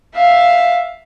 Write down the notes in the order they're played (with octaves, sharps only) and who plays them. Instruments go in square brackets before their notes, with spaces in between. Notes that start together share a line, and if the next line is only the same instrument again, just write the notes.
[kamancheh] E5 F5